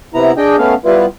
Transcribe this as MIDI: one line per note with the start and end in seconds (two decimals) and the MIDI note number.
0.14 0.32 48
0.14 0.32 59
0.14 0.32 64
0.14 0.32 82
0.37 0.56 62
0.37 0.56 68
0.37 0.56 75
0.37 0.56 79
0.58 0.74 57
0.58 0.74 59
0.58 0.74 61
0.58 0.74 77
0.85 1.06 55
0.85 1.06 59
0.85 1.06 64
0.85 1.06 65
0.85 1.06 71